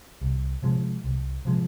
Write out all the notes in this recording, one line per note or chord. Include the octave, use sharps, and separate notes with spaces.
C2
C3 F3 G#3
C2
C3 F3 G#3